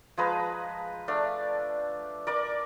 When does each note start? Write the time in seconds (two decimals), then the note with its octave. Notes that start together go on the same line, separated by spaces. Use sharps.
0.17 F3 G#3 B4 A#5
1.08 A3 D4 F5
2.27 A#4 D5 D6